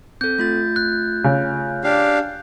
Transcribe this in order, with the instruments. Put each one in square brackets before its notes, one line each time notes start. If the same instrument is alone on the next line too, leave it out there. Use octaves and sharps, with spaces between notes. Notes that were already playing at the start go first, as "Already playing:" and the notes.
[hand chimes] C4 A4 [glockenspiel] G6
[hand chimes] A3 F4 A6
[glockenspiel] F#6
[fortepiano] C#3
[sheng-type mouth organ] D4 G4 F5